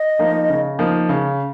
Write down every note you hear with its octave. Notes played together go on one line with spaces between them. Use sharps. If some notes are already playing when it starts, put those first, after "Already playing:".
Already playing: D#5
F3 A#3 D#4
C#3
F3 A#3 D#4
C#3